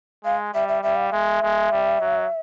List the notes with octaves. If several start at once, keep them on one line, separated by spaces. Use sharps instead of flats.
G#3 F5
G3 E5
E5
G3 E5
F5
F5
G#3 E5
G#3
G3
F#3